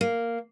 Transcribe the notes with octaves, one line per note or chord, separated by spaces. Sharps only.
A#3